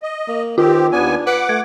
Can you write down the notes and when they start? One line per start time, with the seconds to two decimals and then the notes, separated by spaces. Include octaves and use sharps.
0.03 D#5
0.28 A#3
0.58 D#3 C4 F4 G4
0.92 D#2 B3 D4 G#5
1.26 B4 F#5 D6
1.49 A3 G#6